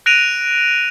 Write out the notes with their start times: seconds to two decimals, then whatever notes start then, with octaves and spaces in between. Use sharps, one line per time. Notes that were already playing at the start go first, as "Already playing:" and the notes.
0.06 F#6 A#6 D7 D#7 F7